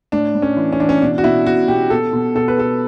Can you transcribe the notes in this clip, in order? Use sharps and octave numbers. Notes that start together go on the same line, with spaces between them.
A2 D4
A2
C#4
E3
C#4
E3 D4
C#4
B2 D4
F#4
B2 E4
B2 F#4
B2 G4
B2 A4
B2
B2 A4
B4
B2 A4